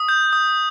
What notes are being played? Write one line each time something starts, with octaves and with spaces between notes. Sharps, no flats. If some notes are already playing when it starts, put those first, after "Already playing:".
Already playing: D#6
G6
D#6